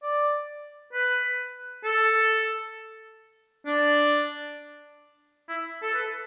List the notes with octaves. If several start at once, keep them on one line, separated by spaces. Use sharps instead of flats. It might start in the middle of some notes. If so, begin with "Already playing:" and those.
D5
B4
A4
D4
E4
A4
B4